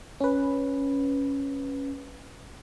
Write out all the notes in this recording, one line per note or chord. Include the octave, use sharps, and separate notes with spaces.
C#4 B4